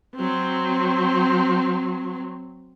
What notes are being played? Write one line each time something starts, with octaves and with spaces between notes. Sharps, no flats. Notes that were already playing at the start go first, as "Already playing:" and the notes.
F#3 C4